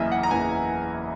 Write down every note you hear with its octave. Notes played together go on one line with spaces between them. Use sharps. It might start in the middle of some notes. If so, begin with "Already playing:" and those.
Already playing: F#1 E2 C#3 E3 A#3 D#5 E5
F#5
A#5
F#1 E2 C#3 E3 A#3 G#5